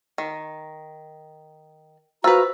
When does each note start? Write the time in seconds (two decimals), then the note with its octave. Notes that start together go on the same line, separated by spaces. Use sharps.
0.18 D#3
2.24 F4 F#4 B4 C5 A#5 E6